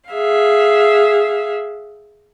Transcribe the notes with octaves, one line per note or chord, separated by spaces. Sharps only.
G#4 E5 F5